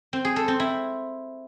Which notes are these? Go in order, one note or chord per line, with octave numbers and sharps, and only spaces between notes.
C4
G#4
A4
C4
E4